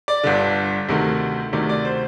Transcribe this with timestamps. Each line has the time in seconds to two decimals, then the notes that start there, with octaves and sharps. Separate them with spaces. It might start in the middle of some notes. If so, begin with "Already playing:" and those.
0.08 D5
0.23 G1 G2 D3
0.89 D2 C3 D#3 A3
1.53 D2 C3 D#3 A3 D5
1.69 D5
1.85 C5